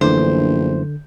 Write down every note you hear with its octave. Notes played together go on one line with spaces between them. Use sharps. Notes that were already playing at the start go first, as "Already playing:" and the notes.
A#1 F#2 D3 E3 A3 C5